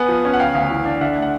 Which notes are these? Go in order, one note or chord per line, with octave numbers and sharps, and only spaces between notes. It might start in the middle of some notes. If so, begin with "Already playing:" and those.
Already playing: B3 F#5 G#5
F3
C#4
F#5
C#3 F5 G5
D2
E3
D4
D3 E5 F#5
A3
F#5